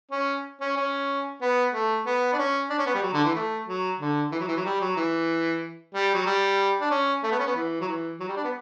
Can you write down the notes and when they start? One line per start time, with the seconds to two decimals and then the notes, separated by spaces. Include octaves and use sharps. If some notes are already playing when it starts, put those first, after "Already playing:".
0.12 C#4
0.61 C#4
0.76 C#4
1.42 B3
1.74 A3
2.06 B3
2.33 D4
2.38 C#4
2.70 D4
2.78 C#4
2.86 B3
2.95 G3
3.02 F#3
3.13 D3
3.25 E3
3.36 A3
3.67 F#3
3.99 D3
4.32 E3
4.40 F#3
4.48 E3
4.56 F#3
4.65 G3
4.81 F#3
4.97 E3
5.94 G3
6.14 F#3
6.26 G3
6.81 D4
6.91 C#4
7.24 A3
7.32 B3
7.40 C#4
7.47 B3
7.56 E3
7.81 F#3
7.88 E3
8.20 F#3
8.28 G3
8.37 D4
8.44 B3